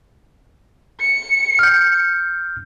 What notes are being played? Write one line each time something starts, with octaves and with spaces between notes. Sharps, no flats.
C#7
F6 G6